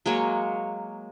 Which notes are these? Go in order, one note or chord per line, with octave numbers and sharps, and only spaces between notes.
F#3 G#3 A#3 C#5